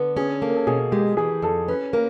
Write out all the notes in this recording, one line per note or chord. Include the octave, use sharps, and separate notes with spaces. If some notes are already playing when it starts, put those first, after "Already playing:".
Already playing: D3 B3
C#4 G#4
A#3 A4
A#4
A4
B2 G#4
G#3 G4
E3 G#4
F2 A4
C#4 B4
A#3 A#4